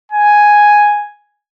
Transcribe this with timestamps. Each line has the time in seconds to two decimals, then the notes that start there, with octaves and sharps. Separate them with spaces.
0.12 G#5